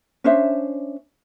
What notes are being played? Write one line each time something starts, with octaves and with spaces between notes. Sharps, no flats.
C#4 D4 C5 E5